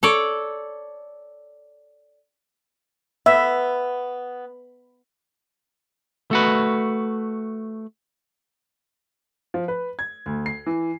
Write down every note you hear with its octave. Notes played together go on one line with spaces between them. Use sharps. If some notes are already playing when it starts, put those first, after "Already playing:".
A4 C#5 D5
B3 E5
A3 F#4 B4
F3
B4
G#6
D2
C7
E3